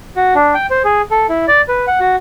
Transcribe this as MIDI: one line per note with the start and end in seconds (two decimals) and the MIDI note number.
0.16 0.34 66
0.35 0.54 62
0.54 0.66 79
0.71 0.82 72
0.85 1.02 68
1.11 1.26 69
1.29 1.46 64
1.48 1.61 74
1.69 1.86 71
1.87 2.00 78
2.00 2.16 66